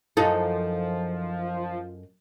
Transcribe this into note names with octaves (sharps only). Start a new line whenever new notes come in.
F#2 F3 D#4 A4